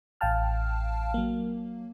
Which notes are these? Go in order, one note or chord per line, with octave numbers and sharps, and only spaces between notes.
A1 F5 G5 A5 F6
F#3 A#3